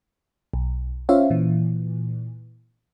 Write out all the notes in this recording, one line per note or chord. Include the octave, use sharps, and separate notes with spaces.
B1
C#4 F4 C5 C#5 E5 F5
A#2 E3